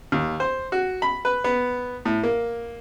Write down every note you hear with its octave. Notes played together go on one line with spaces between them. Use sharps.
D#2
C5
F#4
B5
B4
B3
A2
A#3